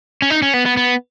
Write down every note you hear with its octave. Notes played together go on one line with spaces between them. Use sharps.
C#4
D#4
C#4
B3
B3
B3